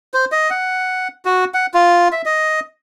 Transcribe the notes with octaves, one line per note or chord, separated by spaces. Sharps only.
C5
D#5
F#5
F#4
F#5
F4
E5
D#5